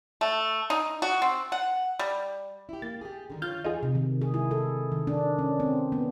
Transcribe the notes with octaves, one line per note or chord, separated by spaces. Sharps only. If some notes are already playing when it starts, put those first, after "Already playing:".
A3
D#4
F#4
C4
F#5
G3
E4 G4
A#3 A6
G4 G#4
D3 D#3 G3
F4 A#4 C#5 F6 G6 A6
E2 D#4 F4 G#4
C3
D#3
G#4
E4
A4
D#3
D4
C#4
C4
B3